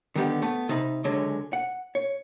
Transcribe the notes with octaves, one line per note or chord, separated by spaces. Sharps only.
D3 D#3 G3 B3 G4
A3 B3
C3 D#4 B5
C#2 D3 F#3 G#3 C#4
F#5
C#5